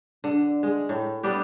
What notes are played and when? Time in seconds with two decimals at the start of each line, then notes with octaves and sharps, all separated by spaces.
0.24 D3
0.63 G#3
0.89 A2
1.23 G3 B3 D4 G4